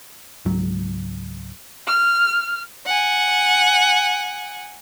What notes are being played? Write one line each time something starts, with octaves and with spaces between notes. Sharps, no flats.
C#2 G#2 F#3
F6
F#5 G#5